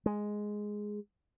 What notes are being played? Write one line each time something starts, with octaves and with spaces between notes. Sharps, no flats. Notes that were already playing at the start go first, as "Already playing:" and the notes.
G#3